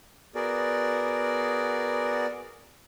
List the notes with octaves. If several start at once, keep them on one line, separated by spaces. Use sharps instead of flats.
B3 F#4 G#4 A#4 D5